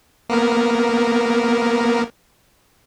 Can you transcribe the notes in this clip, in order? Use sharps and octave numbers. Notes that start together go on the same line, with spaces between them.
A#3 B3 A#4